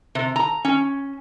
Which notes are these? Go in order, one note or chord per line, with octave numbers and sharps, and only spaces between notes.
C3
A#5
C#4